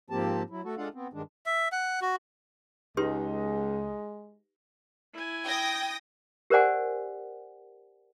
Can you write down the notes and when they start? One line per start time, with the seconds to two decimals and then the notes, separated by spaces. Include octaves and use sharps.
0.10 G#2 F3 A#3 C4 G4 A5
0.50 F#3 E4
0.64 A3 F#4 A4
0.77 G#3 D4 F4 A4 F5 F#5
0.94 B3 C4
1.13 G2 D#3 G#3 D4
1.46 E5
1.72 F#5
2.02 F#4
2.97 C#2 G#3 D#4 G4 B4 C6
5.14 E4 G#5
5.45 G5 D#6 A#6
6.50 G4 A#4 C5 D5 F#5 G#5